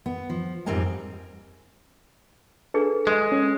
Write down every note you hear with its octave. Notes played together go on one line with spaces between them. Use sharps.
B3
F3
F2 G#2 G3 C4 A#4 G#5
D4 G#4 A4 B4
G#3 C6
C#4